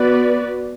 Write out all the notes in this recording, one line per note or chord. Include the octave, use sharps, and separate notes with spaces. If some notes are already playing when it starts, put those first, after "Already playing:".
Already playing: B3 F#4 B4 D5